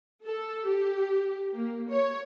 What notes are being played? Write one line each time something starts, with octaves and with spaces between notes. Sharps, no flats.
A4
G4
A#3
C#5